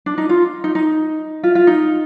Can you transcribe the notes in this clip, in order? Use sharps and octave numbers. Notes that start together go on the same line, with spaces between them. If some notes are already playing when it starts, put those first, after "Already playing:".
D4
D#4
F4
D#4
D#4
F4
F4
D#4